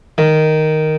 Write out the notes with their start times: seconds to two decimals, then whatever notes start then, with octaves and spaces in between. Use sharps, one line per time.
0.18 D#3